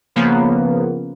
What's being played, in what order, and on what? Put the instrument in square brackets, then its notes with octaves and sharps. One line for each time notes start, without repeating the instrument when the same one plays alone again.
[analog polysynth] C#3 F3 A#3 B3